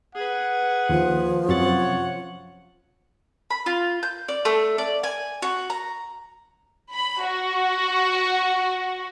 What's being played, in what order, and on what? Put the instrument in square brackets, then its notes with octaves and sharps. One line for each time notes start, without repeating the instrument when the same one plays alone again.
[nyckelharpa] G#4 B4 [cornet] F#5
[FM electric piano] D#2 [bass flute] F3
[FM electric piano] F#2 C3 A6 [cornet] C#5 [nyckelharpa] F#5
[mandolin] B5
F4
G6
D5
A3
D5
G#5
F#4
A#5
[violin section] B5
F#4